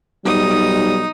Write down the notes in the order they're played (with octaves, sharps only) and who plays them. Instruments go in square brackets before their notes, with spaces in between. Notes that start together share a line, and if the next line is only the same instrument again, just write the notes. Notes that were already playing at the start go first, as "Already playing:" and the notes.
[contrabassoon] B1 [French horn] G3 [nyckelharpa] D#4 D#6